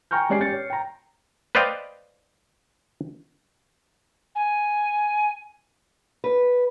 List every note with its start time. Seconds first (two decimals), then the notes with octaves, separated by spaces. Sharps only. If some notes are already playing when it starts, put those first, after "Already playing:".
0.11 G5 G#5 A#5 C#6 F6 G6
0.29 G3 G#3 C#4 D5 G#5 C7
0.40 C#4 G4 A6 C#7
0.52 C#5
0.70 G5 A#5
1.55 B4 C5 D5 D#5 F5 G5
4.35 G#5
6.24 B4